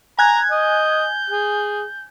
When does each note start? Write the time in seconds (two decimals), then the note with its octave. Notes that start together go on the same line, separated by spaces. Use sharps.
0.19 G#5 A#5 F#6 G#6
0.51 D#5 G6
1.30 G#4